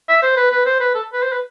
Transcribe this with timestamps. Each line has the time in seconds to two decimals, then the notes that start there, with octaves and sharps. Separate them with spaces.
0.09 E5
0.22 C5
0.37 B4
0.51 B4
0.66 C5
0.80 B4
0.95 A4
1.13 B4
1.23 C5
1.32 B4